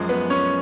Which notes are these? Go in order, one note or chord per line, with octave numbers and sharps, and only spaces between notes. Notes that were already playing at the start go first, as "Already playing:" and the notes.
Already playing: F#2 F3 G#3
B3 B4
C#4 C#5